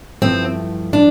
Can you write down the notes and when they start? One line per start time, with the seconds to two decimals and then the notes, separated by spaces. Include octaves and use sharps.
0.22 G2 F3 A3 C4 E4
0.93 D4